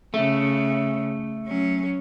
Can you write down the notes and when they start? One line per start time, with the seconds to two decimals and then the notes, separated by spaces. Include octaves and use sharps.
0.14 C#3 A3
1.46 F#3 C#4